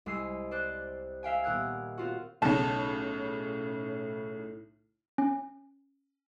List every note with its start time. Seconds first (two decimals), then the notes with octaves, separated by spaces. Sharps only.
0.06 C2 G#3 E6 C7 D#7
0.51 C5 D5 F#6
1.23 E5 F5 G5 G#5
1.44 D#1 B3 A#4 E6 F#6 G#6
1.98 C4 F4 F#4
2.42 B1 A2 C#3 A5
5.18 C#4